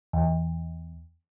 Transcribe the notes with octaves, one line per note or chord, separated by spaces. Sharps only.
E2